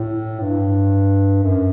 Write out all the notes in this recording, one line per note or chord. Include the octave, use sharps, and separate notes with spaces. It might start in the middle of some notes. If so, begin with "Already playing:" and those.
Already playing: A2
G2
F#2